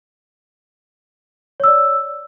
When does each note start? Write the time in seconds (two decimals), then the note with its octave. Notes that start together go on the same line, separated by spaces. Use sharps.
1.60 C#5
1.64 E6
1.67 D5